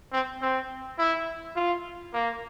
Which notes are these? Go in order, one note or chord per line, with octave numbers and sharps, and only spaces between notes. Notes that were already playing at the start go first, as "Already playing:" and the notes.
C4
C4
E4
F4
A#3